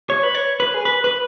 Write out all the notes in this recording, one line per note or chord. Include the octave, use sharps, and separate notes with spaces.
C#5
B4
C#5
B4
G#4
B4
B4